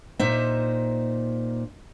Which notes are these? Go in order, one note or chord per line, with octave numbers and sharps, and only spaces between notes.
A#2 D#4 C5 E5